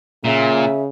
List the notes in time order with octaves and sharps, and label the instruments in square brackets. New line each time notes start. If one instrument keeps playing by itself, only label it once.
[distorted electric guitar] A#2 [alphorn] C#3 [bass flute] E5